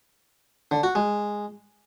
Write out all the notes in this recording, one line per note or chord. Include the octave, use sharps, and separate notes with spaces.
D3
F#4
G#3